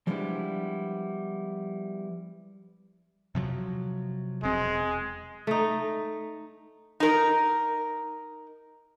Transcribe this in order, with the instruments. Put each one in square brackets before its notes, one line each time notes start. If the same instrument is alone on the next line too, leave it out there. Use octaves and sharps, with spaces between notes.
[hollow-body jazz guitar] F3 G3 G#3 B3 D4 E4
[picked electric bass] C3 F3 F#3
[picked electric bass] E1 C4 [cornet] G#3
[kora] A3 D#4
[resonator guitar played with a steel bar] D#4 A#4